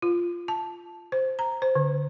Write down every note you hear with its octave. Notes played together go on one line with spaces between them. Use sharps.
F4
A5
C5
A#5
C5
D3